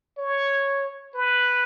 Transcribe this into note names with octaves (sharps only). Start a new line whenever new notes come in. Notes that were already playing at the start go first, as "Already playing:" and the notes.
C#5
B4